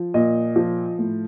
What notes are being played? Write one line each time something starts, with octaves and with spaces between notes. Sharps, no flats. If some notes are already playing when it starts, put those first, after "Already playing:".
Already playing: F3
A#2 D#5
F3
A2